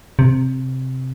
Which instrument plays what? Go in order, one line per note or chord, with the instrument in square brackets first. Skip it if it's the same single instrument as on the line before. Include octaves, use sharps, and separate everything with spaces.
[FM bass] C3